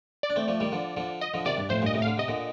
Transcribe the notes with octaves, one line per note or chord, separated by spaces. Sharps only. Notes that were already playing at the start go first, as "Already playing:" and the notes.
D5
D4
A3 C4
F3 A3
D#3 G3
D3 F3
D3 F3
D#5
D3 F3
C3 D#3 D5
G2
F2 A2 C5
G2 A#2 D#5
A2 C3
D3 F5
C3 D#5
A#2 D3